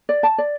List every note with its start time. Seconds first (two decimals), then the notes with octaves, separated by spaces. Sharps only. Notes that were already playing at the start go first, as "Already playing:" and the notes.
0.09 D5
0.23 A5
0.38 D5